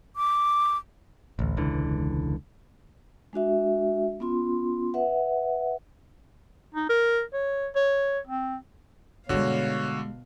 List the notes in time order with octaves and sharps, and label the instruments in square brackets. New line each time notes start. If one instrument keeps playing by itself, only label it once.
[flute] D6
[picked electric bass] A1 D2
E1 C#2 D3 E3
[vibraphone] G#3 D4 F#4 E5
B3 C#4 F4 C6
B4 E5 F#5
[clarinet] D#4
A#4
C#5
C#5
C4
[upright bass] G2 G#3 [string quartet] B2 F5 [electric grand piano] D3 F#4 [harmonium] C#5